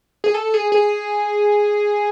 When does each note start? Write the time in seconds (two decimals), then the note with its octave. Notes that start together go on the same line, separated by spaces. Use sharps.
0.24 G#4
0.34 A4
0.54 G#4
0.72 G#4